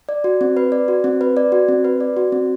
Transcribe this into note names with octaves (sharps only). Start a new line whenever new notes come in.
D5
F#4
C4
B4
D5
F#4
C4
B4
D5
F#4
C4
B4
D5
F#4
C4